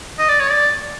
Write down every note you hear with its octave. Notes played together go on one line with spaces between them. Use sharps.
D#5
D5
C#5
D5